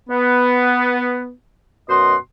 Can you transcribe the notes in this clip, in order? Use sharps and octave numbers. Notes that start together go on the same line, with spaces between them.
B3
F#2 B2 D#5 F#5 C6